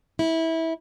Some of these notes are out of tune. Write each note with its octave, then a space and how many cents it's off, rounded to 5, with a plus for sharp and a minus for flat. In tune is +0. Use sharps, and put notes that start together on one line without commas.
E4 -20